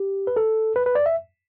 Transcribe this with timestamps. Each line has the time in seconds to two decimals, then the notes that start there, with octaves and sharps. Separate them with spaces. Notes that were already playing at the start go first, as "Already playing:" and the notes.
Already playing: G4
0.27 B4
0.36 A4
0.76 B4
0.86 B4
0.95 D5
1.06 E5